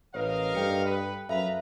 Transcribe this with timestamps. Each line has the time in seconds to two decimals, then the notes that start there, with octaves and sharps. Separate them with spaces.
0.14 A1 A#4 B4 C#5 D#5 F5
0.55 G2 A4 G5 C#7
0.85 B4
1.29 F#2 A4 B4 E5 F5 A#5